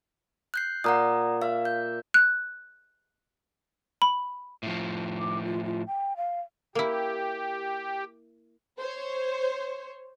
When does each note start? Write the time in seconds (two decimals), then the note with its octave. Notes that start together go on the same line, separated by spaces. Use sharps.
0.54 F#6 G6 C7
0.84 A#2 F#5 A#5 D#6
1.42 E5 F5
1.65 G6
2.14 F#6
4.02 B5
4.63 A2 F3
5.18 D6
5.45 F4
5.64 F4
5.87 G5
6.17 F5
6.75 A#3 E4 G4
8.79 C5 C#5